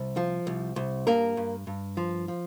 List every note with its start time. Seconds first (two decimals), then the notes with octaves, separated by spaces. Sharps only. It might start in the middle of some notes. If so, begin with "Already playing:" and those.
Already playing: C2
0.17 F3
0.47 C2
0.76 C2
1.07 G2 A#3 A#4
1.37 G2
1.67 G2
1.97 F3
2.28 F3